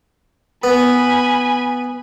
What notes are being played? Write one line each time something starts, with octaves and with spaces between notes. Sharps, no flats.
B3 G#5 B5